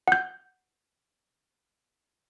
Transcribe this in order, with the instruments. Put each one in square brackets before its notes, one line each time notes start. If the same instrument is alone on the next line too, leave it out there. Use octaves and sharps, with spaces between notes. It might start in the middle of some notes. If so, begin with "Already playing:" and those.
[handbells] F#5 G6